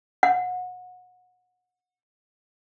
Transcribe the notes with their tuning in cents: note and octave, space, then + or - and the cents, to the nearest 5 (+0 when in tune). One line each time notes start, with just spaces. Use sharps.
F#5 -30